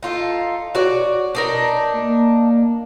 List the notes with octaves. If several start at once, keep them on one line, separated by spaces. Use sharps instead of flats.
D#4 F4 A4
F#4 C#5 D5
D4 D#4 A#4
A#3